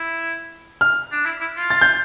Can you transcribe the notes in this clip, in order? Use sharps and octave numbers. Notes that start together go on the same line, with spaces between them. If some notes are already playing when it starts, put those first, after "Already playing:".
Already playing: E4
F6
D4
E4
E4
F4
A6
G6